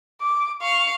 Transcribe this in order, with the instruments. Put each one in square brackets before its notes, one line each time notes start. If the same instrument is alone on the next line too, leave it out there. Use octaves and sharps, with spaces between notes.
[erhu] D6
[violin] F5 [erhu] C#6